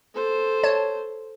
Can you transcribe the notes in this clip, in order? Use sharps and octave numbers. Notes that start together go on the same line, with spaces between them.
A4 C5
C#5 A5